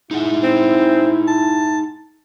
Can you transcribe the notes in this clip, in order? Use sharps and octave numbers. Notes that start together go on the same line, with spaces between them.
D#4 E4 G#4 F#5
C4
A5